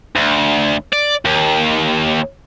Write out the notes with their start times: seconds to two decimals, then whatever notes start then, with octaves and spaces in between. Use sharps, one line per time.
0.16 D2
0.93 D5
1.25 D#2